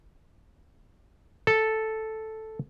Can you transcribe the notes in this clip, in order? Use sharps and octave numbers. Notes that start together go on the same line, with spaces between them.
A4